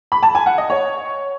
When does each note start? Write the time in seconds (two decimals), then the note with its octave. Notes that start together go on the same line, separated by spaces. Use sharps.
0.12 B5
0.23 A5
0.35 G#5
0.46 F#5
0.58 D#5
0.70 C#5